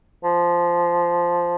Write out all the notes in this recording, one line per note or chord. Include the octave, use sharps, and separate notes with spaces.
F3